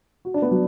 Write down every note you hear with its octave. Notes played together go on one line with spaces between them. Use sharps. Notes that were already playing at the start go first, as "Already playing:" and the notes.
F#4
D4
B3
F#3